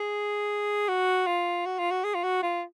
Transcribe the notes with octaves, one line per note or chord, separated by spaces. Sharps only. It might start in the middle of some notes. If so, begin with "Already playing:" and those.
Already playing: G#4
F#4
F4
F#4
F4
F#4
G#4
F4
F#4
F4